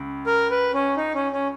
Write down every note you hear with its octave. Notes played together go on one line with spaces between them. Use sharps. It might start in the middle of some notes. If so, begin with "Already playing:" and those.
Already playing: C#2 C#3
A#4
B4
C#4
D#4
C#4
C#4